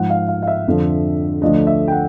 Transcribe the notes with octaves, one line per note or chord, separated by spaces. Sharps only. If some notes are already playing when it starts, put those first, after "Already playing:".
Already playing: G#2 F3 G#3 F#5
F5
F5
F5
E5
F2 D3 F3
D2 D3 F3 A3 D4 D#5
E5
G5
F#5